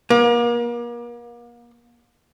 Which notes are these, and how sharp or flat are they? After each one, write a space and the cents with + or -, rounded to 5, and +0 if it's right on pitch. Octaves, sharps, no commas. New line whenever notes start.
A#3 +35